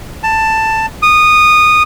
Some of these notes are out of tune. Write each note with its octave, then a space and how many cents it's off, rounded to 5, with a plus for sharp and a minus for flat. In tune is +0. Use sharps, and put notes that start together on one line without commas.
A5 +10
D#6 -15